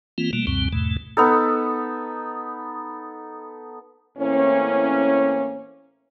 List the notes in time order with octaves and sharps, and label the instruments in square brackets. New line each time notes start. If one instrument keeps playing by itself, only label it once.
[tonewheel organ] E3 A#3 C4 F4
B2 G3 A3 A#3
C#2 F#2 B2 G3 C4
E2 G#2 B2 A3
[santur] B3 D#4 A4
[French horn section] A2 E3 A#3 C4 C#4